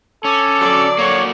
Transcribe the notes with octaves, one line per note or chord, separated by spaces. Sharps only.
C#4 A4 D6
D3 F#3 D5
A#3 F#4 C#5